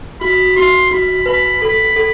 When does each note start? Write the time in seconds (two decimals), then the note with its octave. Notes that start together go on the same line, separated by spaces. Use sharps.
0.21 F#4 B5
0.56 F#4 C6
0.91 F#4 B5
1.26 B4 B5
1.61 A4 B5
1.96 A4